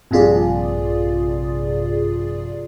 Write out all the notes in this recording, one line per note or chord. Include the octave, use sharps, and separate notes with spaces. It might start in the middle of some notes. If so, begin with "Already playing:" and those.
A#1 G2 C3 F4 G#4 D5